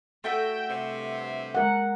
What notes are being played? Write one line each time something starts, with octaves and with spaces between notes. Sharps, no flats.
A3 F#4 E5 G5
G2 C3
G#3 A#4 F#5